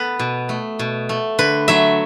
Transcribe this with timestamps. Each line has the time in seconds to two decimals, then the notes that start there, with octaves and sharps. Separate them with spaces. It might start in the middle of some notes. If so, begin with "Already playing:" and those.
Already playing: B3 A4 B4
0.19 B2
0.49 A3
0.79 B2
1.09 A3
1.39 D3 B4
1.68 F#3 A3 E5